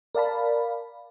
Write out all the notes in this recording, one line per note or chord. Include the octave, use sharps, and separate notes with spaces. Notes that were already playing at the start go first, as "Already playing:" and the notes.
A#4 D5 F5 A5 B5